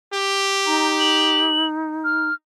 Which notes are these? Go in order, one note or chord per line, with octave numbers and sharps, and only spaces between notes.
G4
D#4 A#5
F#7
F6